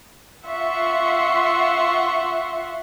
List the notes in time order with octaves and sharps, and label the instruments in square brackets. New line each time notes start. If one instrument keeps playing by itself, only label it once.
[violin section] F4 E5 F#5 C6 C#6